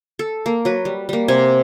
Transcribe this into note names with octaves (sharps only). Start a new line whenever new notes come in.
A4
A#3
F#3 B4
G3
G3 A#3
C3 G#5